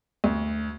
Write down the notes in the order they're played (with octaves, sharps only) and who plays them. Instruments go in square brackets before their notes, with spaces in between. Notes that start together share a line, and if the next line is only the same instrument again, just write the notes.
[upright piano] D2